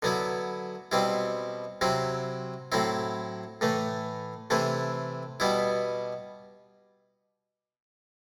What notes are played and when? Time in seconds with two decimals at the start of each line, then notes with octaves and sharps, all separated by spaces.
0.03 D3 F#3 B3 E4
0.92 B2 G3 C4 E4
1.81 C3 F#3 C4 E4
2.72 A2 F#3 C4 E4
3.61 A2 E3 A3
4.50 C3 E3 A3 E4
5.40 B2 G3 B3 E4